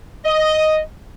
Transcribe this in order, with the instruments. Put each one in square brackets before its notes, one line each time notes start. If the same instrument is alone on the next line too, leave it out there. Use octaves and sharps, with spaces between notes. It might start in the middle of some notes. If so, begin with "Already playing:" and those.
[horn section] D#5